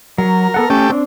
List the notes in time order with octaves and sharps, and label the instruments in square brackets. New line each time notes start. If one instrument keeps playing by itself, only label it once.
[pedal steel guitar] F#3 [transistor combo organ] A#4
[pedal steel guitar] B3 A4 F#5
[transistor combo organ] A3 G4 [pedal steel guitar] C#4
[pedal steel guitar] C4 D4